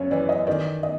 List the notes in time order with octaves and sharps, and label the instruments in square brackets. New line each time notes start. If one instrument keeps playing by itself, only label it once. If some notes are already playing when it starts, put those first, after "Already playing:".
Already playing: [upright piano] F#2 C#3 [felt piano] C#5
[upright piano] E3 [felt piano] D5
[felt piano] D#5
[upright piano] D#3 [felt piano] D5
[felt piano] D#5